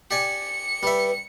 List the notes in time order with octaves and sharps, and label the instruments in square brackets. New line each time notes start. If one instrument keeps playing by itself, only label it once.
[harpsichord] G4 D5 G#5 [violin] C#7
[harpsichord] G3 E5 [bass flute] B4